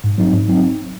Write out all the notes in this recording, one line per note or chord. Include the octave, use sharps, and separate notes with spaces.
G#2
F#3 C4 D#4
G#2
F#3 C4 D#4